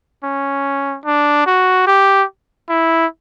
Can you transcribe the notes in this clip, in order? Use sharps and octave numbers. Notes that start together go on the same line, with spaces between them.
C#4
D4
F#4
G4
E4